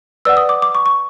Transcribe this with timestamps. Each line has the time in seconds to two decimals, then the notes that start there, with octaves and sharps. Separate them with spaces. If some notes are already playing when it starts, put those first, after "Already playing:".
0.25 B4 D5 F#5 E6
0.37 D#6
0.49 D6
0.62 D6
0.75 C#6
0.86 C#6